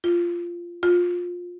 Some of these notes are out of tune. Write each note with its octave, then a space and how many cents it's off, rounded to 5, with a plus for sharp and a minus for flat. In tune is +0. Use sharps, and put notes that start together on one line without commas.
F4 -10
F4 +20